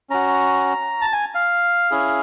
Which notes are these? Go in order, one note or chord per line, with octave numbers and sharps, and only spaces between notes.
C#4 F#4 A#5
A5
G#5
F5
C#4 E4 G#4